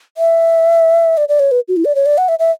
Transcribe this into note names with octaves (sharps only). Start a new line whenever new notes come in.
E5
D5
D5
C#5
B4
F#4
E4
D5
C#5
D5
F#5
E5
E5